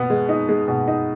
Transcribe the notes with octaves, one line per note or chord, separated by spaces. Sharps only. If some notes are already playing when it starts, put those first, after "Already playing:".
Already playing: B2 B3
G#3
D#4
G#3
B2
D#4